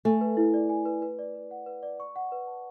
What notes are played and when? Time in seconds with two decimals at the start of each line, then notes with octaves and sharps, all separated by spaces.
0.05 A3 G#5
0.21 B4
0.37 E4
0.54 D5
0.69 G#5
0.85 B4
1.02 B4
1.19 D5
1.35 B4
1.51 F#5
1.66 B4
1.83 D5
2.00 C#6
2.16 F#5
2.32 B4
2.47 A5